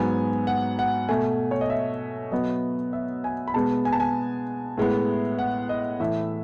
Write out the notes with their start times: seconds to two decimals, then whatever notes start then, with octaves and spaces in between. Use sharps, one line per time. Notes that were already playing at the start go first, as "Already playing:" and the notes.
Already playing: G#2 F#3 B3 G#5
0.47 F#5
0.79 F#5
1.09 B2 A3 G#5
1.51 C#5
1.61 D#5
1.70 E5
2.32 B2 F#3 B3 D#5
2.93 E5
3.24 G#5
3.48 B5
3.54 B2 G#3 B3 A5
3.85 G#5
3.93 A5
4.00 G#5
4.78 A2 G#3 B3
5.39 F#5
5.69 D#5
6.00 A2 E3 A3 E5